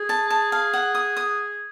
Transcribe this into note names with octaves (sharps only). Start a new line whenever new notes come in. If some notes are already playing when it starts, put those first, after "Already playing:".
Already playing: G#4
A5
A5
F5
F#5
D#6
D#6